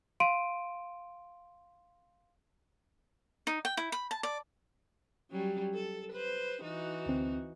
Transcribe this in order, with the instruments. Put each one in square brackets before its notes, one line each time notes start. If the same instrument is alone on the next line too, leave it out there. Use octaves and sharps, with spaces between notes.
[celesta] F5 C6 D7 D#7
[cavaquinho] D#4
G5
E4
B5
A5
D5
[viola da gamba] F#3 G3 C#4
A4
B4 C5
E3 D#4 F#4
[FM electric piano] D2 C4